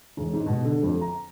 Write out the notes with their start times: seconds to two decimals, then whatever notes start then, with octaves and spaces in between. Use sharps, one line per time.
0.17 E1
0.33 G#2
0.46 B2
0.64 D3
0.83 F2
1.01 A#5